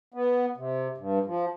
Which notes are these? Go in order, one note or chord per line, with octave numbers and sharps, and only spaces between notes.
B3
C3
G2
F3